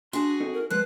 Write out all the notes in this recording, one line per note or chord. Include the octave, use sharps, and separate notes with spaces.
D4 F#4 G#4 C6
C4 D#4 A4
A#4
F3 G#3 B4 C5 F#6